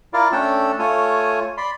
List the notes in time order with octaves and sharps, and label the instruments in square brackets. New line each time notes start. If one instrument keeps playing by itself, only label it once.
[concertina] E4 F4 A#4 D5 F5
A3 C#4 D4 A4 G5 E6
A3 F4 C#5 G#5
D5 B5 C6